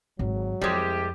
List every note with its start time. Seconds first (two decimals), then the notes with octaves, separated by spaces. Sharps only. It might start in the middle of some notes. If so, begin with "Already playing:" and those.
0.19 G#1 F#3
0.61 C2 F2 C3 G3 G#3 G4